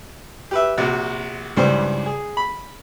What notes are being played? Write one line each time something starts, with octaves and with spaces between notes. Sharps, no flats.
G4 B4 E5
A#1 C3 F#4
C#2 G2 E3 G3 C4 C5
G#4
B5